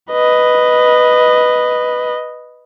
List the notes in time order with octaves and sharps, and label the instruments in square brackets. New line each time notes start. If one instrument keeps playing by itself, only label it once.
[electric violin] B4 D#5